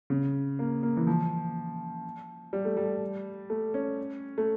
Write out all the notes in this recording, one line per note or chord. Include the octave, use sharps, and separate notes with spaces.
C#3
A#3
A#3
E3
F3
G3
A3
G3
A3
C#4
A3